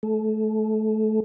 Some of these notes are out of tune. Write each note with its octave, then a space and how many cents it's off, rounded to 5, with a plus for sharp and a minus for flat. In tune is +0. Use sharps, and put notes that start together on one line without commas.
A3 -25